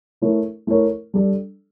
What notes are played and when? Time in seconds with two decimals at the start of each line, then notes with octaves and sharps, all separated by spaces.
0.22 A3 E4 A#4 C#5
0.67 A3 E4 A#4 C#5
1.14 G3 D4 A4